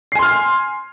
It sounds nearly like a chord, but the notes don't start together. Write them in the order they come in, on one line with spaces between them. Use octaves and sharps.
C7 G#5 C6 F6